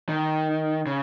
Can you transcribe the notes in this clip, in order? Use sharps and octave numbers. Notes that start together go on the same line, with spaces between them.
D#3
C#3